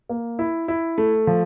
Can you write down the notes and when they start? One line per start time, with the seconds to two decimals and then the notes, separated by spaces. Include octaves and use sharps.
0.09 A#3
0.39 E4
0.68 E4
0.98 A3
1.27 F3